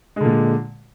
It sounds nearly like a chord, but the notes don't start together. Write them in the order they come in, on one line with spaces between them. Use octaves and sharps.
G#3 D3 A#2